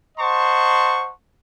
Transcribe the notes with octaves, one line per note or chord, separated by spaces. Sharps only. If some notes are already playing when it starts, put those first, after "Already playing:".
C5 D#5 F#5 A5 C6 C#6